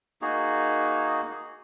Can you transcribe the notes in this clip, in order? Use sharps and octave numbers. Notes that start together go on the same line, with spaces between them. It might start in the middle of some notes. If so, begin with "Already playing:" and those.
A#3 D#4 F#4 G#4